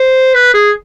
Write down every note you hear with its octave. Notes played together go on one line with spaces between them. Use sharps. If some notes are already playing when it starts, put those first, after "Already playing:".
Already playing: C5
B4
G#4